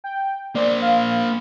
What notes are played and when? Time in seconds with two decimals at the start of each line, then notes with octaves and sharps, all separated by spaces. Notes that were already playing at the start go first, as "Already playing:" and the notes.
0.04 G5
0.55 A#3 C5 D5
0.82 F5